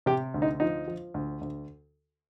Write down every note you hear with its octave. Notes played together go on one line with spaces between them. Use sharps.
C3 G4
D2
D#4
F3 D#4
F3
D2
D2